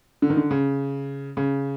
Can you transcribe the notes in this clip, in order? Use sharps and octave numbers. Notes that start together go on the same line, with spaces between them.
D3
D#3
D3
C#3
C#3